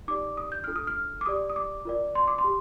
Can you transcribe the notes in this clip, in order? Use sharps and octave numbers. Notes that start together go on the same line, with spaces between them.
D#4 G4 D5 D6
D#6
G6
D4 F4 A4 F6
D#6
F6
D6
G4 D5 D#6
D#6
D6
F4 A#4 D5
C6
D6
C6
G4